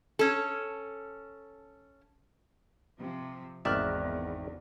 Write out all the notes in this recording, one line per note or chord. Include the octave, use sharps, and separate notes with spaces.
C#4 A4
C3 F3
G#1 E2 D#3 D5 E5 F6 F#6